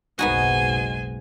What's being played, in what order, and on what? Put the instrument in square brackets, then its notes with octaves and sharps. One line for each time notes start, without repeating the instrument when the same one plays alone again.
[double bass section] F#1 B1 G#3 [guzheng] B3 D#4 F#4 [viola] C5 G#5